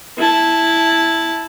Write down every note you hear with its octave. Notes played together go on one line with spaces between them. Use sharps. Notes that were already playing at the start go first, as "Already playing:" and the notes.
E4 A5